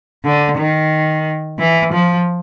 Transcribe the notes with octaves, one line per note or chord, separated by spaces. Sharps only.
D3
D#3
E3
F3